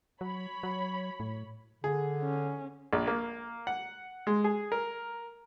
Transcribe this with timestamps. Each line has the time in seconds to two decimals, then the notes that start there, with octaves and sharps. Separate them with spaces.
0.21 F#3 C#5 B5
0.63 F#3
1.20 A2
1.84 D3 G#4
2.22 C#4
2.93 A#1
3.07 A#3
3.67 F#5
4.27 G#3
4.44 G#4
4.72 A#4